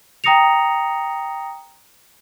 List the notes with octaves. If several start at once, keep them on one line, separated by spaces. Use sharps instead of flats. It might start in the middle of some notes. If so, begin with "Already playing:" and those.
G5 A#5 D#6 A#6 C#7 F7